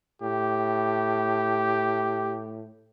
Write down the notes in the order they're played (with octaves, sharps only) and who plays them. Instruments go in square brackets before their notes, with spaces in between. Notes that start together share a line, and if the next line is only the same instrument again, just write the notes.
[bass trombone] A2 [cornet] G4